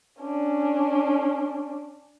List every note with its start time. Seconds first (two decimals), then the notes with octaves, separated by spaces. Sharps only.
0.20 C#4 D4